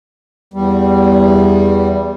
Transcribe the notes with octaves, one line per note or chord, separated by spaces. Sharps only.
E2 G3